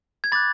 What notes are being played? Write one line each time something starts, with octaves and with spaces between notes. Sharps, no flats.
G#6
B5 D6 F#6 A6